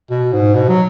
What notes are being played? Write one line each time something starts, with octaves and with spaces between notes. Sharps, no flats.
B2
G#2
B2
F#3